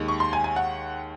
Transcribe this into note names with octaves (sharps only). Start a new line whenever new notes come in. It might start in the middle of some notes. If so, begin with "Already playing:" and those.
Already playing: D#2 D#3 G#3
C#6
C6
G#5
G#5
F#5